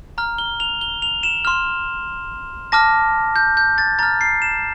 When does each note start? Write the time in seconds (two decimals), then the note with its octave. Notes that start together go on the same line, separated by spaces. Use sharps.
0.18 A#5 F6
0.38 G7
0.60 F7
0.81 G7
1.02 F7
1.23 E7
1.45 C6 F6
2.72 A5 D6 F6 A#6
3.36 G6
3.57 G6
3.78 A6
3.99 A#5 F6 A6
4.21 C7
4.42 E7